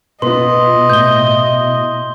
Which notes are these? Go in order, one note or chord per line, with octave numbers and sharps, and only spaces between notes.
B2 F4 B4 D#5 C6
A2 G6 G7